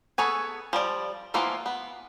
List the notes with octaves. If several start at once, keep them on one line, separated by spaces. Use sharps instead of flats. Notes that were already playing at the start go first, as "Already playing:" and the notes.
B3 G#4 A4 C#5 G#5
F3 G3 D5
E3 F3 A#3 B3 F4
B3